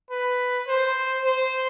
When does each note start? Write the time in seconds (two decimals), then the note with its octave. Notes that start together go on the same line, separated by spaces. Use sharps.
0.11 B4
0.68 C5
1.25 C5